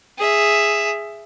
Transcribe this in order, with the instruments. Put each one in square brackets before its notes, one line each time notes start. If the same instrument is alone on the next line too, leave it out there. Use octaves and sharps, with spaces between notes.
[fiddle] G#4 E5